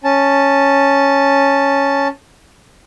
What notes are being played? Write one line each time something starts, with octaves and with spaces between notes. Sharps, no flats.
C#4 A5